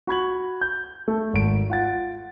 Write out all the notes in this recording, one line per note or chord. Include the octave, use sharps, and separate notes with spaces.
F#4 B5 G#6 F#7
G6
A3
G#1 D7
F4 F#5 A6